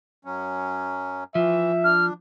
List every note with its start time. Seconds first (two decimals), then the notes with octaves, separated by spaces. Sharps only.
0.25 F#2 F#3 C#4
1.35 E3 F3 E5
1.84 D4 F6